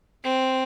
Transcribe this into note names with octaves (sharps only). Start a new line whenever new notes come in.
C4